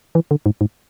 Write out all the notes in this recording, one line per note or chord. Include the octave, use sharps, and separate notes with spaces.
E3
D3
G#2
G#2